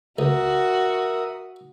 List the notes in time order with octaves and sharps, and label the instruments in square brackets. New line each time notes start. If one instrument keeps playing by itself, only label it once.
[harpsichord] C#2 [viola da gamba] F#4 [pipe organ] A#4 E5 D#6